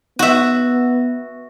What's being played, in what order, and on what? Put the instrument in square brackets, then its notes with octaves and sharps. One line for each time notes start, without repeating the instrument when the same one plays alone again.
[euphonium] B3 [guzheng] F#4 E5